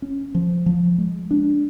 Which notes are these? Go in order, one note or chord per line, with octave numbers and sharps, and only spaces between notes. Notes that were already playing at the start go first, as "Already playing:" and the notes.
C#4
F3
F3
G#3
D4